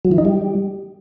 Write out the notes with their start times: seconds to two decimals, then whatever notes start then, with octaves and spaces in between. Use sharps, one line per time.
0.05 F#3
0.11 E3
0.18 D#4
0.25 G3